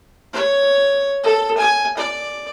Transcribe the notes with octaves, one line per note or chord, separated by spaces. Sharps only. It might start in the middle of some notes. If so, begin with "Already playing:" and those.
C#5
A4
G#5
D5